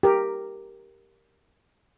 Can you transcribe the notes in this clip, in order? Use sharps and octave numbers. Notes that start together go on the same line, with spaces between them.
G4 A#4